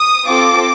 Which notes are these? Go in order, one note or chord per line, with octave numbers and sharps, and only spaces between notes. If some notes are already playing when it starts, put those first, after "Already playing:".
Already playing: D#6
C4 F4 A4 D6